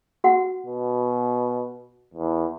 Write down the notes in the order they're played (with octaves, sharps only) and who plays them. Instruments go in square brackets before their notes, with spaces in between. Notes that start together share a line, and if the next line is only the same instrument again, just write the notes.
[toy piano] F#4 F#5
[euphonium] B2
E2